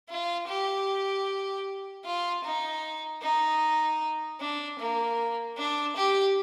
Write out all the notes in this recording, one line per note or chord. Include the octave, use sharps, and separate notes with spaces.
F4
G4
F4
D#4
D#4
D4
A#3
D4
G4